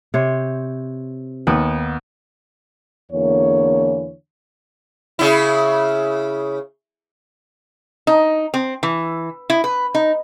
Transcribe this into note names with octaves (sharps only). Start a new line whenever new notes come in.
C3 C5 C#5
D#2 B3
E2 D3 E3 A#3 C#5
C#3 E4
D#4
C4
E3
E4
B4
D#4